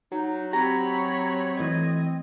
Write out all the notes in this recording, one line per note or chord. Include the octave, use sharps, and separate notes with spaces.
F#3 D#4
C4 G4 C#5 A#5 B5 A#6
E3 A3 D#5 G#6